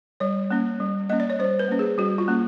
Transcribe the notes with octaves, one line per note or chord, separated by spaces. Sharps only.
G3 C#5
A#3 C#4
G3
A#3 C#4 D#5
D5
C#5
G3 C5
B4
A#3 C#4
G#4
G3 F#4
F4
A#3 C#4